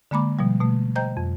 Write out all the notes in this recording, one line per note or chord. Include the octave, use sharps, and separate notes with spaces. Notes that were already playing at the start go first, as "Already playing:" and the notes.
D3 G#3 A#3 B5 D6
B2 F3 G3
B2 A3
C5 D#5 G5 A#5 G6
F2